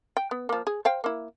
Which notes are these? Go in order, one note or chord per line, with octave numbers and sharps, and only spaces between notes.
G5
B3
F3 A#3
G#4
C5 F5 G5
A#3 E4